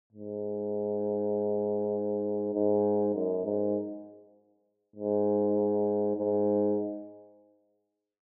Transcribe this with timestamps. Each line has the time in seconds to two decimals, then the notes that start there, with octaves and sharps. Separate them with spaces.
0.13 G#2
2.55 G#2
3.15 F#2
3.45 G#2
4.96 G#2
6.17 G#2